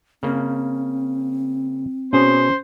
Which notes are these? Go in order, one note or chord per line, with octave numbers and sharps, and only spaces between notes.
C#3 A#3 C4
B2 C#4 G#4 C5 C#5